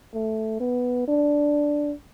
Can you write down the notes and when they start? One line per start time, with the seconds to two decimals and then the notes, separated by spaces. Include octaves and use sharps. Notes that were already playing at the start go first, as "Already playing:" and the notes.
0.14 A3
0.60 B3
1.08 D4